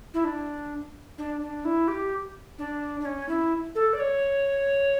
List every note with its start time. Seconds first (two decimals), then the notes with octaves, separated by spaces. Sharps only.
0.14 E4
0.24 D4
1.18 D4
1.41 D4
1.65 E4
1.88 G4
2.58 D4
3.00 D4
3.05 C#4
3.29 E4
3.75 A4
3.93 D5
3.99 C#5